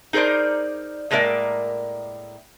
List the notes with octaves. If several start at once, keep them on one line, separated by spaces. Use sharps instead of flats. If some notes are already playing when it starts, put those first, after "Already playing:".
D#4 G#4 A#4 C5 D5
A2 G#3 A#3 A#4 D5 E5